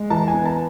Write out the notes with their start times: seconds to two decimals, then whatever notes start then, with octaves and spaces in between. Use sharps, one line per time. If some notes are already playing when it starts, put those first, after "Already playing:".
Already playing: G#3
0.10 E3 A5
0.28 G#5
0.34 B3
0.45 A5